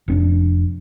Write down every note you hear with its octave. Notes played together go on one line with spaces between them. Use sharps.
F1 C4 D4